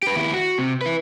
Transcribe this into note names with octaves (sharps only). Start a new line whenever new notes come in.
G4 B4
D#2 E4
F#4
C3
E4 B4